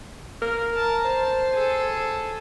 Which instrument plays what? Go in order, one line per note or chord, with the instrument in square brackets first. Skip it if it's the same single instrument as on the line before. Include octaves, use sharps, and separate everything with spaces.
[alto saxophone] A#4
[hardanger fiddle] A5 A#5
[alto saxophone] C5 [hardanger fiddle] A5
[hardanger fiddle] G#4 A4